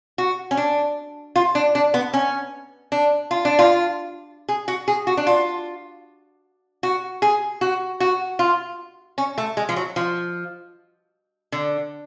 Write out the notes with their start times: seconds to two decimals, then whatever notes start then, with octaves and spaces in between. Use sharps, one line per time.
0.18 F#4
0.51 C#4
0.57 D4
1.36 F4
1.55 D4
1.75 D4
1.94 B3
2.14 C#4
2.92 D4
3.31 F4
3.45 D4
3.59 F4
4.49 G#4
4.68 F#4
4.88 G#4
5.07 F#4
5.17 D4
5.27 F4
6.83 F#4
7.22 G#4
7.61 F#4
8.00 F#4
8.39 F4
9.18 C#4
9.38 A3
9.57 G#3
9.69 F3
9.76 F#3
9.96 F3
11.52 D3